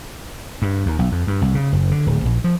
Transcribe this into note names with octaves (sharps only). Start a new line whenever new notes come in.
G2
D#2
B1
F2
G2
C2
C#3
F#1
D3
D1
A#1
F3